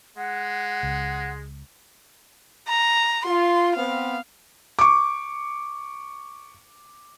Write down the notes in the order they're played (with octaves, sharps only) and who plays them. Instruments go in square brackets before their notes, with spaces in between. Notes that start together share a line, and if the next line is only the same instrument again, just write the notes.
[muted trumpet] G#3 [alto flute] F#5
[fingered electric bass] C#2
[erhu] A#5
[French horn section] F4 [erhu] C6
[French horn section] B3 C4 [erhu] F5
[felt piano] C#6 D6